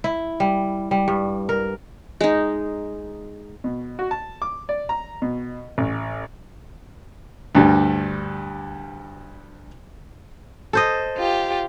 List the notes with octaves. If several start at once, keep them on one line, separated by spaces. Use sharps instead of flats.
E4
G3
G3
G2
A#4
G#3 D#4
B2
F#4
A5
D6
D5
A#5
B2
A1
D2 G2 G3
A4 C5 D#5
F4 G4